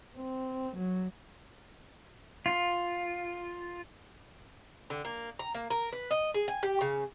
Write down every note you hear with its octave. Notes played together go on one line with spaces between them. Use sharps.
C4
F#3
F4
D3
A#3
A#5
A#3
A#4
B4
D#5
G#4
G#5
G4
C#3